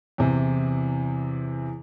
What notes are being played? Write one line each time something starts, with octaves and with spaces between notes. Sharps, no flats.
E2 C3 E3